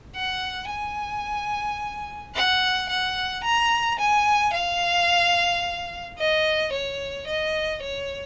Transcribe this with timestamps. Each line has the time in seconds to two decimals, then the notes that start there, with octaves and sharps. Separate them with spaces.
0.15 F#5
0.69 G#5
2.35 F#5
2.89 F#5
3.43 A#5
3.99 G#5
4.53 F5
6.18 D#5
6.73 C#5
7.27 D#5
7.83 C#5